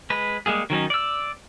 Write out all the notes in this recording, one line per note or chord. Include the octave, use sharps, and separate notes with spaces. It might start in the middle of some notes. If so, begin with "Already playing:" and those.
G#3 B4
G3 G#3 A#3 G#4
D#3 F#3 C#4 D#4
D5 E6